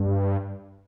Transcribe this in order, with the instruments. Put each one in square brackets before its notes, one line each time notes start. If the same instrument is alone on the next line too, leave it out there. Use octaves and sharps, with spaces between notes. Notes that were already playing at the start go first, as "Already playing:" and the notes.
Already playing: [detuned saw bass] G2